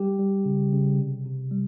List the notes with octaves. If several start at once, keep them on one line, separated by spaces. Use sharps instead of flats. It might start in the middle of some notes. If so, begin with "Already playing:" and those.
Already playing: G3 G4
G3
C#3
C#3
C3
C3
G3